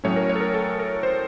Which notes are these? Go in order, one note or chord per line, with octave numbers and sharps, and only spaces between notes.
A2 F#3 A3 C#4 C#5
A#4
C#5
A4
A#4
A4
A#4
C5